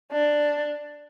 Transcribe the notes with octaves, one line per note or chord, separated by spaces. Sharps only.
D4